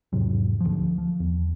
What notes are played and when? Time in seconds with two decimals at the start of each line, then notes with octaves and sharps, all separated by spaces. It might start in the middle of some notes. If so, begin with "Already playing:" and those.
0.13 E2 G#2 C3 F#3
0.60 D2 F3
0.98 F3
1.20 E2